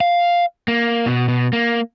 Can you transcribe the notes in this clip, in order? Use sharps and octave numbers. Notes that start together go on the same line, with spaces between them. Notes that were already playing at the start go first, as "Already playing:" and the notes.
F5
A#3
B2
B2
A#3